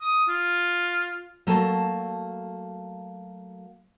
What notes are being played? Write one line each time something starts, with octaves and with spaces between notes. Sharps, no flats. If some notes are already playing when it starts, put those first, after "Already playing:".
D#6
F4
F#3 A3 A#3 A5